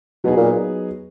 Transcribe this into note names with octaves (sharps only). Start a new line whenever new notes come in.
B2 F#3 B3 D#4 G#4
A#2